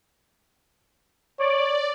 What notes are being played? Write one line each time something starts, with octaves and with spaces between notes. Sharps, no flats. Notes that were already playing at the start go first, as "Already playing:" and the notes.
C#5 D5